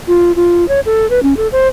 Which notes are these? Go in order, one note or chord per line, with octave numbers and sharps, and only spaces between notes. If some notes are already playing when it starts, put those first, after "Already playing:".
F4
F4
C#5
A4
B4
C#4
A4
C5